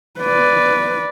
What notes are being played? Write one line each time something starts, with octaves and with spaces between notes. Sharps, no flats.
B4 D5